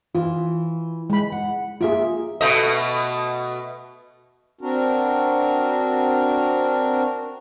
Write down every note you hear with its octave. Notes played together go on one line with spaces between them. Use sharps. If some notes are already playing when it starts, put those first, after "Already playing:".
E3 F4
G#3 B5
F#5
A#3 F4 G#4 E5
B2 A3 D#5
C4 D4 F#4 A#4